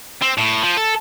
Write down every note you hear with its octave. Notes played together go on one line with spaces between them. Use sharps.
C4
A2
F3
A4